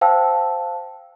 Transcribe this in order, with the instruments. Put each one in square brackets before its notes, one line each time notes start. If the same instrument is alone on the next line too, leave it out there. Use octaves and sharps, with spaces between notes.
[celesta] C5 F5 G5 A5 E6